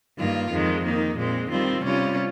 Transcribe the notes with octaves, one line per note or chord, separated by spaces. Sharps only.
G2 D#3 A#3 F4
F2 D#3 G#3
D#3 A#3 D#4
A#2 G#3 C4
D#3 G3 C4 F4
C3 G3 C#4 F4